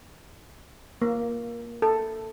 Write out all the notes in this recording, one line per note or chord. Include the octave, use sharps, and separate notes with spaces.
A#3
A4